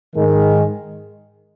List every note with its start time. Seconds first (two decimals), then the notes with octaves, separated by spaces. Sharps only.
0.15 G#2 D#3 G#3